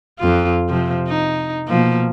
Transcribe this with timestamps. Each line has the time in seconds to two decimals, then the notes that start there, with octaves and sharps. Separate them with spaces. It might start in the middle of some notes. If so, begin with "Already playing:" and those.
0.19 F2 F4
0.68 C3 F3
1.08 D#4
1.68 B2 F3 A#3